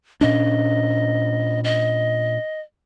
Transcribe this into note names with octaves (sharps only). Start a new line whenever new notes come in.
A#2 C#4 D4 D#5
D#5